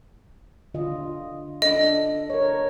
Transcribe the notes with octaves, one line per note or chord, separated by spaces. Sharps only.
D3 F4 D#5
D4 A4 D#5
A#4 C#5